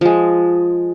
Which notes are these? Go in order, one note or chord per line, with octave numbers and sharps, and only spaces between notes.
F3 G#3